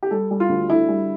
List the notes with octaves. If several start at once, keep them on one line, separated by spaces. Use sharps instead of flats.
G4
G3 A4
G3
F4
D2
D3 E4
G3